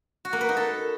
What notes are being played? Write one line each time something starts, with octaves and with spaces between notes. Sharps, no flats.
F#4
A#3
B4
D#4
A4